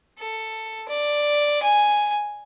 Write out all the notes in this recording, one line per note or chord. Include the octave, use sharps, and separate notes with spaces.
A4
D5
G#5